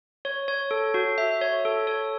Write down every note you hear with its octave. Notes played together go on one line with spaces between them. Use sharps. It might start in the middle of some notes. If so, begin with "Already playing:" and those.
C#5
C#5
A4
F#4
E5
C#5
A4
C#5